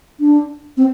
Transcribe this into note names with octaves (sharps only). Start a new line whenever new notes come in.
D4
C4